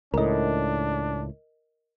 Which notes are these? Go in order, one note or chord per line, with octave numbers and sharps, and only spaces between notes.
C#2 A2 D4 A#4 D#5